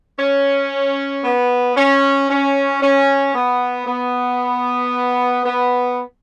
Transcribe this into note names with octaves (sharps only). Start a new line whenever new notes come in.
C#4
B3
C#4
C#4
C#4
B3
B3
B3